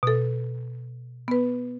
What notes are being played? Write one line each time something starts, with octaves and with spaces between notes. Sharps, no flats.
B2 A4
B3 B4